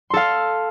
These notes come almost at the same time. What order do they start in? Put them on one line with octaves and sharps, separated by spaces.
C6 A4 F5